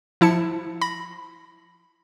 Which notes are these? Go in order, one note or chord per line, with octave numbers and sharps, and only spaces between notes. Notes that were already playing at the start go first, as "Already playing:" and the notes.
F3 E4 A5 C#7
B5 A#6